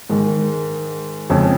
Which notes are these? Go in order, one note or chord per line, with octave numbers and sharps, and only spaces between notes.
G#2 D#3 G#3
F2 C#3 F3 G#3 C#4